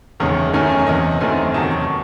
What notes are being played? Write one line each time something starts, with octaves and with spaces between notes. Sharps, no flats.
F#1 E2 D#3 G#3 C#4
F#2 D#3 A3 C#4 G#5
G#5
C#5
E2 C3 E3 D#5
F#2 D#3 A3 C4 G#5
E2 C3 D#3 F#3 A5
C#6